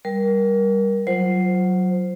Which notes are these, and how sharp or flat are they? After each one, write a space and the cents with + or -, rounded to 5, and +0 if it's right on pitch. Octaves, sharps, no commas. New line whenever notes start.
G3 +0 A#4 +20
F#3 +0 F4 +0 C5 +0